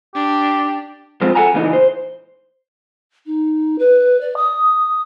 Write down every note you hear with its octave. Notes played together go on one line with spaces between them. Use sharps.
D4 G4
F3 G#3 C4 F4 C5
A4 F#5 G#5 A#5
C#2 A#2 E3 D#4
C5
D#4
B4
D5
D#6